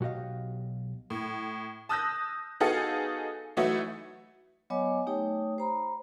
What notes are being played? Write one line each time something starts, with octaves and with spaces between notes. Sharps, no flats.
B1 F#4 G4 D#5 F5
A2
A5 D#6 E6 F#6 G6 A#6
B3 D#4 F#4 G#4 A4 F5
E3 F#3 A3 D#4 E4 F#4
F#3 B3 C#5 D#5 G#5 D6
A3 D#4 G4 C#5 G5 D#6
C5 A#5 B5